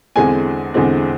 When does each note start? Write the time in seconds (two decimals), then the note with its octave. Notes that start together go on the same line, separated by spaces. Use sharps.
0.16 E2 D3 G#3 C4 G#5
0.74 E2 D3 G#3 C4